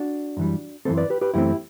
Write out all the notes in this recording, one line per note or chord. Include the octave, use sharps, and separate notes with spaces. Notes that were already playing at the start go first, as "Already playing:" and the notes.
Already playing: D4 F#4
F#2 E3 G3
F#2 E3 A3 C4 A4 C5
B4 D5
G4 B4
G4 B4
F#2 E3 A3 C4 E4 G4